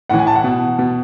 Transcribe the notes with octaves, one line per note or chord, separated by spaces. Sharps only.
A2 E3 F#5
G#5
A5
F#5
B2
B2